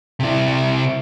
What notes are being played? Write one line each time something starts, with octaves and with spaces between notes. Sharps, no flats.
C3 E4